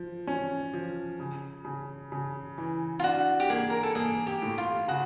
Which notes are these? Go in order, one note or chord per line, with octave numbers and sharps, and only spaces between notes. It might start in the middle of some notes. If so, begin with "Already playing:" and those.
Already playing: F3
C#4
F3
C#3
C#3
C#3
E3
F4
D4 F#4
G4
A#3 G#4
A#4
A4
A#3 G#4
G4
A2
F4
C#3 F#4